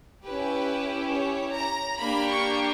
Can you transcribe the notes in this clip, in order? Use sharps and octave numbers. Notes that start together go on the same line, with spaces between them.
C#4 E4 G4 B4
C#5
A#5
A#3 D4 G4 B5
C#6